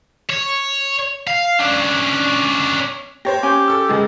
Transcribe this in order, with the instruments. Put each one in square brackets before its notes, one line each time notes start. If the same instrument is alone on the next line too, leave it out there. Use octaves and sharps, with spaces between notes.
[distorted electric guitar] C#5
F5
C#4 D4
[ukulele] G4 [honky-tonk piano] C5 C#5 A#6
[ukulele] C#4 G#5 [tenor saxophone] G4
[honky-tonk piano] A4 E6
F#1 G#3 G#4